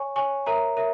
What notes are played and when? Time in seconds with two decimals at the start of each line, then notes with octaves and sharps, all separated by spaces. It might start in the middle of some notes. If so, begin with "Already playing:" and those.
Already playing: C#5 G#5 C#6
0.16 C#5 G#5 C#6
0.46 A#4 C#5 E5 A#5
0.77 A#4 C#5 E5